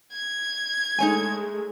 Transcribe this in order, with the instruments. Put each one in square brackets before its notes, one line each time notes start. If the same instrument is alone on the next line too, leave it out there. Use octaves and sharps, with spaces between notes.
[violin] G#6
[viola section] G#3 A3 [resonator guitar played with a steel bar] D#4 C#5 G#5